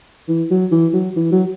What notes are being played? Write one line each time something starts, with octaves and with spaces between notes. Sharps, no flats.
E3
F#3
E3
F#3
E3
F#3